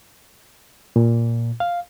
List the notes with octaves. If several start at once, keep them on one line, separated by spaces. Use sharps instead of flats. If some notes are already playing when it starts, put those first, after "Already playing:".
A#2
F5